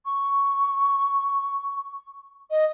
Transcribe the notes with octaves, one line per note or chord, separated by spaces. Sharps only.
C#6
D#5